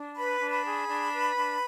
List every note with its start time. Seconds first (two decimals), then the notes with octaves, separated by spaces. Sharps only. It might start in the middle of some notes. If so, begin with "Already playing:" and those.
Already playing: D4
0.16 B4 B5
0.39 D4
0.52 B5
0.64 G#4
0.87 D4
1.12 B4
1.36 D4